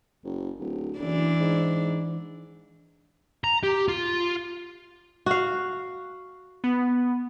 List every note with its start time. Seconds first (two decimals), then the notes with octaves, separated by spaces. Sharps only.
0.24 F#1
0.59 D1
0.99 F#1 E3 D4
1.40 G#2
3.44 A#5
3.63 G4
3.88 F4
5.26 F#4 F5
6.64 B3